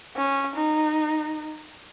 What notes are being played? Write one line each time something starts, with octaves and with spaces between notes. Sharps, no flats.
C#4
D#4